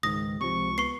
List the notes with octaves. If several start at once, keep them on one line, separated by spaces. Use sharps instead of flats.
C#2 G#2 D#3 D#6 A#6
C#2 C3 F3 C#6
B3 C#6 C7